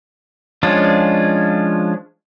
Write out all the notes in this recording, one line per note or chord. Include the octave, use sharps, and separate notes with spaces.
F3 G#3 C#4 D4 F4